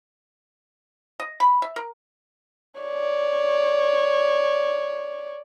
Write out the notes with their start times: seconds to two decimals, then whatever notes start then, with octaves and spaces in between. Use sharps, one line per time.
1.20 D#5
1.40 B5
1.62 E5
1.76 A#4
2.81 C#5 D5